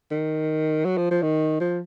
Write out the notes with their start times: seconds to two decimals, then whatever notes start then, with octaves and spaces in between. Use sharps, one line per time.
0.11 D#3
0.85 F#3
0.97 F3
1.11 F3
1.23 D#3
1.60 F3